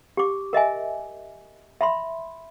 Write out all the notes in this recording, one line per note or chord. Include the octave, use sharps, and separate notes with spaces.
G4 D6
A#4 D#5 E5 G#5
E5 B5 C6